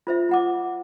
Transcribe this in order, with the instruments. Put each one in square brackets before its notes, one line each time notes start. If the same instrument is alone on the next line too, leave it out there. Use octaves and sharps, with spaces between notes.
[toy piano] F4 C5 E5
F4 F#5 D6